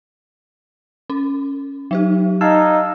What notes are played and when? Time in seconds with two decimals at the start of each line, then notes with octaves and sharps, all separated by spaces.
1.10 C#4
1.91 F#3 D#4 G4
2.41 D#4 F5 A5 E6 G#6